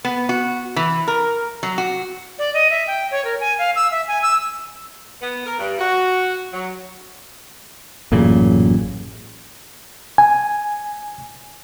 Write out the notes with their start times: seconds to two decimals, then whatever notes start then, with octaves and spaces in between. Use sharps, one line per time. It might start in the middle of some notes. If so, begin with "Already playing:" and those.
0.05 B3
0.29 F#4
0.76 E3
1.08 A#4
1.63 F#3
1.78 F#4
2.39 D5
2.54 D#5
2.70 E5
2.87 G5
3.11 C#5
3.25 A#4
3.40 G#5
3.59 F5
3.76 E6
3.91 E5
4.08 G#5
4.22 E6
5.21 B3
5.45 A#4
5.59 G2
5.79 F#4
6.53 F#3
8.12 A1 F#2 A#2 C#3
10.18 G#5